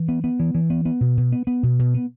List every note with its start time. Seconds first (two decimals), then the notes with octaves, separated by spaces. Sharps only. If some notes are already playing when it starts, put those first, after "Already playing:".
Already playing: E3
0.09 B3
0.24 B3
0.40 E3
0.55 E3
0.70 B3
0.85 B3
1.01 B2
1.17 B2
1.32 B3
1.47 B3
1.63 B2
1.79 B2
1.94 B3